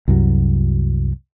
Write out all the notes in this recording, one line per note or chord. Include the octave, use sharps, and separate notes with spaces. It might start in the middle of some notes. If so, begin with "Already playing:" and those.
C2 F#2 F#3